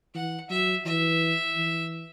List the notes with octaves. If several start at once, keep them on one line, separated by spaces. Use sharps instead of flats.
E3 F#5
F#3 E5
E3 E5
E3